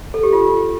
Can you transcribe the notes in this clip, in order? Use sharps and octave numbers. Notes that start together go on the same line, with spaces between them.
A4
G4
F4